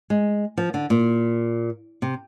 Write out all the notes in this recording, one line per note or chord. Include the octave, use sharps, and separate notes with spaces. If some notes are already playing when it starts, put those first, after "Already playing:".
G#3
F3
D3
A#2
C3